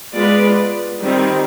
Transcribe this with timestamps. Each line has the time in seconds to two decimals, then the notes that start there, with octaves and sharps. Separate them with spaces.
0.14 G#3 B3 F4 B4 D5
1.00 D#3 G3 C4